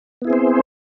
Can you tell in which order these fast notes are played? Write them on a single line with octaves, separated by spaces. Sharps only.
B3 E4 G#4 C4 C5